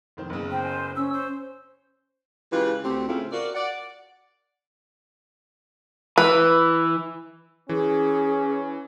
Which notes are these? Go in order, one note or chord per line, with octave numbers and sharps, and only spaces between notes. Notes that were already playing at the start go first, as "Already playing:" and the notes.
F1 D#3 C5
F#1 E2 C#3
C5 G5
G#5
C#4 E6
C5
C#3 E3 G#3 F4 G4 B4
D2 C4 G4
A2 C#3 A3 C4 E4 F4
F4 F#4 A#4 D5
D5 F#5
E3 B4
E3 C#4 G#4